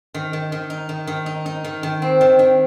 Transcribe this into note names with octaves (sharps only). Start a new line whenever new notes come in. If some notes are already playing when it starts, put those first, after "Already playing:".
D#3
D#3
D#3
D#4
D#3
D#3
D#4
D#4
D#3
D#3
C4
D#3
D#3